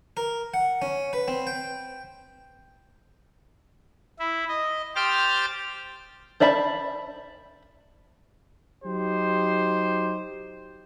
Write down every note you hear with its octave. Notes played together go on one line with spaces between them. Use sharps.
A#4
F#5
C#4
B4
C4
G5
E4
D#5
G4 C5 G5 F6 A6
C5 D5 E5 A5 B5
F#3 D#4 G4 C5